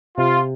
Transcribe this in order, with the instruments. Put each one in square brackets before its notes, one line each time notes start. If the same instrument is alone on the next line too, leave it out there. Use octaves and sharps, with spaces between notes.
[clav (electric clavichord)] C3 [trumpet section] F4